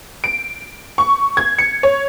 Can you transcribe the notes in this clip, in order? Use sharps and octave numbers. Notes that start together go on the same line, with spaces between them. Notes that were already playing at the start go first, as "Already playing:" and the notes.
D7
C#6
G#6
C#7
C#5